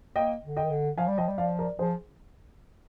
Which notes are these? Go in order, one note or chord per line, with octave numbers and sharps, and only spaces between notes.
A#3 D#5 G5
D3
D#5 G5
D#3
D3
F3 F5 G#5
G3
F3 D#5 G5
G3
F3 D5 F5
A#4 D5
F3 G#4 C5